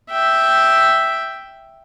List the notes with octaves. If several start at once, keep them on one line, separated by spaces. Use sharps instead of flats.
E5 G5